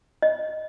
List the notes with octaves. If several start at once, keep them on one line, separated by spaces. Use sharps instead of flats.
D#5